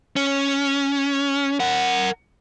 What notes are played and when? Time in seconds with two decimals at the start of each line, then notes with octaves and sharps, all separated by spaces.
0.16 C#4
1.60 A#4 F#5